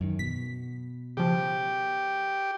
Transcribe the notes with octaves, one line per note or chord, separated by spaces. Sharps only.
F#2 D#3
B2 B6
C#3 F3 G4